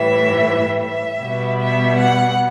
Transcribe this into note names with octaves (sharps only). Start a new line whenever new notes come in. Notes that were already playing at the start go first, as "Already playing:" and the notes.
Already playing: A2 E3 G3 E5
E5
B2 G3 B3
E5
F#5